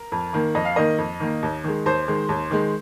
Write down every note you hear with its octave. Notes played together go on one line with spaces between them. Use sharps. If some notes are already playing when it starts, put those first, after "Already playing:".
Already playing: A#4
F2
D#3 A#3
F2 D#5
F5
D#3 A#3 D#5
F2
D#3 A#3
D#2
D#3 G#3
D#2 C5
D#3 G#3
D#2
D#3 G#3